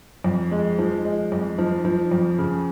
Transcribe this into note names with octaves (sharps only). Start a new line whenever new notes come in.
F2
G#3
F3
G#3
F2
F3
F3
F2
C#3